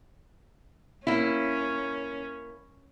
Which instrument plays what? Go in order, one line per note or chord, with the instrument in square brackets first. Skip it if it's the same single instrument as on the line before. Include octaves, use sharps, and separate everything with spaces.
[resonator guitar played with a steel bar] A#3 E4 [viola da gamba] C#4